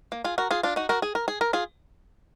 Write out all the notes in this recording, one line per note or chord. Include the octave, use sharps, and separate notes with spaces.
A#3
F4 G#4
F#4 A#4
F4 G#4
D4 F4
D#4 F#4
F#4 A#4
G#4
A#4
G#4
A#4
F4 G#4